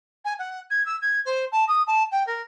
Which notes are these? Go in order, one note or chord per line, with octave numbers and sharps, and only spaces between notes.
G#5
F#5
G#6
E6
G#6
C5
A5
D#6
A5
G5
A#4